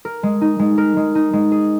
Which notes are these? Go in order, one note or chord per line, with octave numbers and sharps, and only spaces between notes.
A#4
G#3
D#4
G#3
A#4
G#3
D#4
G#3
G#4